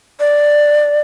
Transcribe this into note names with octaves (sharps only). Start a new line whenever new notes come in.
D5